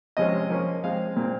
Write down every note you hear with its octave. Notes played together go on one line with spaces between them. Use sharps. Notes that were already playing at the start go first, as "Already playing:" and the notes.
C3 F3 G#3 C#4 D#5
F3 A#3 C#4
F3 G#3 C4 F5
A#2 G#3 C4